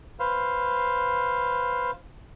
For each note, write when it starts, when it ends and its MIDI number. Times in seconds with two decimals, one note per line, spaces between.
0.19 1.91 71
0.19 1.91 72
0.19 1.91 77